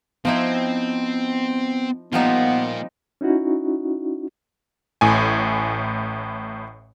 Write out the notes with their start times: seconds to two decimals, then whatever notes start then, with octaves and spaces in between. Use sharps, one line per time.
0.25 F3 B3 C4 D#4 E4
2.13 F3 G3 A#3 B3 D#4 F4
3.21 C#4 D#4 E4 F#4
5.01 A1 A2 G#5